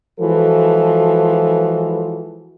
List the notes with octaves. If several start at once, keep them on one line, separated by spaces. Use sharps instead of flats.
E3 F3 G#3 F#4 A4